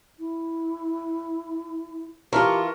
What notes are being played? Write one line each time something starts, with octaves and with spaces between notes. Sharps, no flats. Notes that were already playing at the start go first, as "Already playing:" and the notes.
E4
E3 F4 G4 A#4 A5 C#6